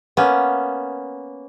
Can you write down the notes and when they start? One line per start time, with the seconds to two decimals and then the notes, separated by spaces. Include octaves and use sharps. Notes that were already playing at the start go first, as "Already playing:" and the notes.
0.17 A#3 B3 C#4